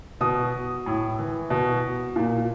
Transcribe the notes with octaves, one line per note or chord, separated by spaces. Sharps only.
B2 D#6
A2
E3
B2
A#2